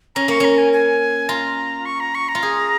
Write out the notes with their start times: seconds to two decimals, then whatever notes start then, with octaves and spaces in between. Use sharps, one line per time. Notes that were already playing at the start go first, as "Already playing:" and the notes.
0.15 C#4 A#5
0.28 A#3 C#6
0.40 C#4 A#5
0.58 G#5
0.73 G#5
1.29 F4 A#5
1.85 C#6
2.00 A#5
2.15 C#6
2.29 A#5
2.35 F4
2.43 G#4